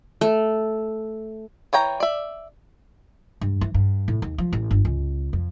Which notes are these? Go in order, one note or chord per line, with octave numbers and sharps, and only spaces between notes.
A3
E3 C#5 G5 A#5
D5 E5
G2
E3
G2
A2
D#2
F3
A1
G1
C#2
F2